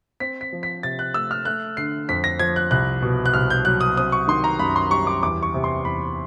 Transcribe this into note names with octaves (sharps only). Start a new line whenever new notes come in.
C4 B6
B6
F3
B6
C3 A6
F#6
A3 E6
F6
A3 F#6
D3 C7
F2 B6
A#6
F3 G#6
F#6
C2 F#6
B2
F#6
C2 F6
G6
F#3 F#6
D#6
C4 D#6
C#6
D#3 C6
A#5
F#2 B5
C6
G3 C#6
D6
E2 D6
C#6
C3
C6
E2 B5